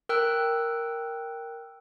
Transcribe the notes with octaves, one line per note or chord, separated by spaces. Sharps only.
A#4 G5 E6 F#6